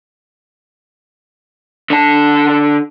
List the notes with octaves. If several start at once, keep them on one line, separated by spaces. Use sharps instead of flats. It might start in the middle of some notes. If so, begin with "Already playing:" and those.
D3 A5